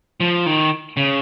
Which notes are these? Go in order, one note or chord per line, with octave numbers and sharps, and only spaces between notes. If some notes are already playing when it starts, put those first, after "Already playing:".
F3
D#3
C#3